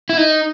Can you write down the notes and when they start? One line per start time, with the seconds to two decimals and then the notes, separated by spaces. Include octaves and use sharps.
0.09 E4
0.17 D#4